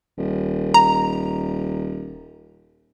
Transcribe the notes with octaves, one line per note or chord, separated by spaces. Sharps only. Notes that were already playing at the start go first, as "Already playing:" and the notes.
D#1
A#5